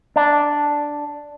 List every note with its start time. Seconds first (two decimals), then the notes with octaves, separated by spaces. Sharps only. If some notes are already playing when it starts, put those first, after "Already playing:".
0.16 D4